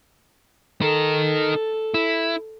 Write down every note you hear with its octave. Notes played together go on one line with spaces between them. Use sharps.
D#4 A4 A#4
E4